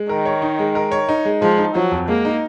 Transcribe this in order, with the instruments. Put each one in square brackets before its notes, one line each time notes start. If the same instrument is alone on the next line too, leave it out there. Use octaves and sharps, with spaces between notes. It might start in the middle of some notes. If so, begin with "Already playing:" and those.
Already playing: [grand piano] G#3
[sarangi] D#3 [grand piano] A#4
[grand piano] C#5
D#4
G#3
A#4
C#5
D#4
G#3
[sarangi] F3 [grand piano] G#3
[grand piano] D#4
[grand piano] F3 [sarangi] F#3
[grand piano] F2
[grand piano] G#3 [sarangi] A#3
[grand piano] D#4